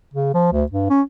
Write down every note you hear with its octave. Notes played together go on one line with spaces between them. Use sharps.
C#3
F3
D2
G2
C#4